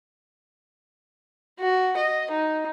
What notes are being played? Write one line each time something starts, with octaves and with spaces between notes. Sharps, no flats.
F#4
D#5
D#4